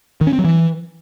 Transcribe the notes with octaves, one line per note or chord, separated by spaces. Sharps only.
D#3
C#4
C4
F#3
E3